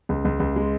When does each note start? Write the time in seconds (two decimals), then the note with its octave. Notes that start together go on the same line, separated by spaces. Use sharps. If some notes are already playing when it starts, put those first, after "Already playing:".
0.09 C#2
0.25 C#2
0.40 C#2
0.56 G#3